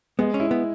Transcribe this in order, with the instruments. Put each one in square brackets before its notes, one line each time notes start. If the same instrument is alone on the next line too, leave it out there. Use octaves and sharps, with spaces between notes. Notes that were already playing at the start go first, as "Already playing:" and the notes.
[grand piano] G#3 [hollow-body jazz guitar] B3
[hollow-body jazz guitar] C#4
[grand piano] E4
[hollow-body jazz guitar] B3